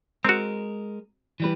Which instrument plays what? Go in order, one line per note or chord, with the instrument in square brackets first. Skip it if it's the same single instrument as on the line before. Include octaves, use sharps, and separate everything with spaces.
[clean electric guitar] G#3 A#4 [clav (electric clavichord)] C4 F#4
[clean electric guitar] E3 G3 B4